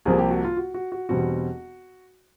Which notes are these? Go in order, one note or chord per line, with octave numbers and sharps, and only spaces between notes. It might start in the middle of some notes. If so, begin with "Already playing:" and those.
C2 C3 F3 A#3 G#4
G4
F#4
F4
F#4
F#4
F#4
E1 E2 B2 G3 C4 F#4